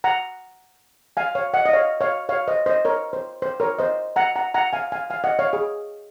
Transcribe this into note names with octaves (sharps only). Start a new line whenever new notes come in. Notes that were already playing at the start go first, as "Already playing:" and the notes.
F#5 A#5
F5 G#5
C#5 F5
D#5 F#5
D#5
C#5 F5
C#5 F5
C#5 F5
C5 D#5
C5 D#5
A#4 C#5
C5
C5
A#4 C#5
C5 D#5
F#5 A#5
F#5 A#5
F#5 A#5
F5 G#5
F5 G#5
F5 G#5
D#5 F#5
C#5 F5
G#4